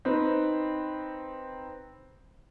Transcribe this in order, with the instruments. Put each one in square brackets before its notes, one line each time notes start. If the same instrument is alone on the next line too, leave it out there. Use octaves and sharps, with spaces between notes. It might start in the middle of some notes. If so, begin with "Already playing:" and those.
[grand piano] C4 D#4 B4